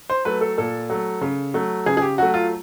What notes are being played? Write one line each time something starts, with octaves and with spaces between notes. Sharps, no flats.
C5
F#3 A3 B4
A4
A#2 A4
F#3 A3
C#3
F#3 A3
C#3 G#4
G#4
G4
F#3 A3 F#4
F4